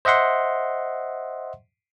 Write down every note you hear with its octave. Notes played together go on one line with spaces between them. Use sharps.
C5 D#5 E5 F#5 C6